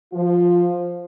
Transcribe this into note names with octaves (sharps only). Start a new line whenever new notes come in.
F3 F4